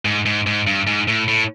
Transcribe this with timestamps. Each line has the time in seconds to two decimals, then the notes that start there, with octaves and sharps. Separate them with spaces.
0.05 G#2
0.26 G#2
0.47 G#2
0.67 G2
0.87 G#2
1.08 A2
1.28 A2